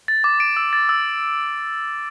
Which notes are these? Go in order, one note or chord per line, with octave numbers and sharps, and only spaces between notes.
A6
D6
D7
E6
A6
E6